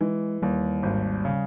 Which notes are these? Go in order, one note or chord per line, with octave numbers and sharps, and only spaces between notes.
E3 G#3
D#2 G3
G#1
C#3